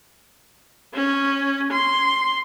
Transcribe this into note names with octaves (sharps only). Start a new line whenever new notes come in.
C#4
C6